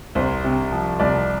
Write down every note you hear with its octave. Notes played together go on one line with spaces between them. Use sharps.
C2 C5
C3
F3
C2 D5